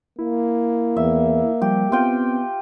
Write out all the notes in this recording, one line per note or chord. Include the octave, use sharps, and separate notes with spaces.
A#3 E4
E2 E5
F3 G3 G4
B3 C4 F4 G5